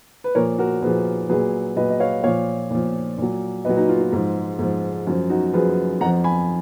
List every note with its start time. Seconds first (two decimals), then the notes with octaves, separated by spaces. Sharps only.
0.24 B4
0.35 A#2 F3 A#4 C#5
0.58 F#4 A#4
0.82 A#2 F3 G#4 B4
1.29 A#2 F#3 G#4 B4
1.76 A#2 F#3 B4 D#5
1.90 D#5
2.00 C#5 F5
2.23 A#2 F3 C#5 F5
2.70 A#2 F3
3.18 A#2 F#3
3.65 A#2 F#3 B4 D#5
3.77 D#4 F#4
3.89 F4
4.01 F4
4.13 G#2 F3
4.59 G#2 F3
5.07 F#2 F3
5.30 D#4 F#4
5.53 F#2 F3 G#4 B4
6.01 F2 F#5 A#5
6.05 F3
6.24 G#5 B5